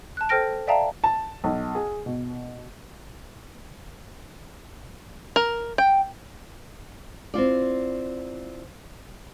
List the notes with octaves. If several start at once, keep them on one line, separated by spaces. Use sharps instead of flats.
A5 F#6
A4 C5 G5 F6 A#6 D7
D5 E5 F5 G5 A5 A#5
A5
B1
G#4
B2
A#4
G5
C4 E4 F4 D5